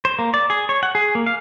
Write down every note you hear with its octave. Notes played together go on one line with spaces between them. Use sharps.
C5
A#3
D5
G#4
C#5
F#5
G#4
A#3
F5